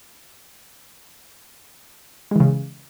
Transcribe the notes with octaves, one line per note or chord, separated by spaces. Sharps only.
C#3 E3 G#3